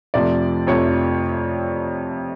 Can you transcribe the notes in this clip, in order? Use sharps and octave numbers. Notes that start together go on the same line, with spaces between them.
F2 C3 F3 A3 D5
F2 C3 F3 A3 C#5